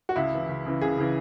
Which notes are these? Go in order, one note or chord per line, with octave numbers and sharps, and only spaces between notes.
F#4
C#2 E4
C#3 E3
C#2
C#3 E3
C#2 G#4
C#3 E3